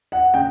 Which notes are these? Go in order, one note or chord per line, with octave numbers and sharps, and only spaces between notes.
F#5
C#3 G5